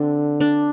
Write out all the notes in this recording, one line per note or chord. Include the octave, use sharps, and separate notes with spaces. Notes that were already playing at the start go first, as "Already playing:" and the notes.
Already playing: D3 C4 D4
D4